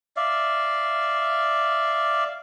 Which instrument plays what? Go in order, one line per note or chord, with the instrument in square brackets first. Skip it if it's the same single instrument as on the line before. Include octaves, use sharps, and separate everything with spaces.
[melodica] D5 E5 F5